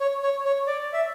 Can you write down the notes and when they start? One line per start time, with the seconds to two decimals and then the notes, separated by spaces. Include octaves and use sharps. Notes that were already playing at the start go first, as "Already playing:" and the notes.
0.01 C#5
0.23 C#5
0.45 C#5
0.67 D5
0.93 E5